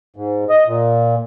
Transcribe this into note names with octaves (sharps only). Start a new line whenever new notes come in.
G#2
D#5
A#2